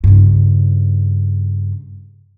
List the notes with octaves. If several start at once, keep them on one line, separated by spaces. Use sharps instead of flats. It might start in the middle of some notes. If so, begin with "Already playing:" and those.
G2 C#3